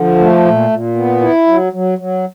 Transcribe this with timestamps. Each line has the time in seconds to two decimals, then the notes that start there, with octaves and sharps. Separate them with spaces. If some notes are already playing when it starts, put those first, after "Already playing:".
Already playing: D3 F3
0.19 A3
0.45 A#2
0.70 A#2
0.96 B3
1.21 E4
1.47 F#3
1.73 F#3
1.98 F#3